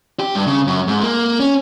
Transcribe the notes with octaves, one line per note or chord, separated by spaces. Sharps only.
G4
G2
C#3
F#2
G#2
A#3
C#4